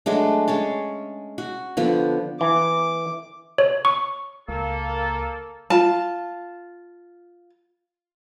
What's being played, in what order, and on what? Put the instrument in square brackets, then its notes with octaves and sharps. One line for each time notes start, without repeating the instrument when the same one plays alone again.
[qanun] F#3 G#3 A3 D4
G#3 C#4 C#5 A5
F#4
D3 F3 B3
[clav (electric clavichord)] E3 [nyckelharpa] D6
[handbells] C#5
C#6
[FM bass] C#2 [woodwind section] A#3 A4
[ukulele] F4 A5